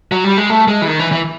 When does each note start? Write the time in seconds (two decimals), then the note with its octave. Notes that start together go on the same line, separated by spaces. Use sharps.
0.12 F#3
0.24 G3
0.37 G#3
0.50 A3
0.68 G#3
0.82 E3
0.88 D#3
0.99 E3
1.12 E3